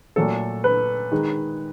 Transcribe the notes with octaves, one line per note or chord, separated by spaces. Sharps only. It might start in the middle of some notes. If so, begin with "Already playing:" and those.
A#2 F#3 A3 A4
B4
D#3 G#3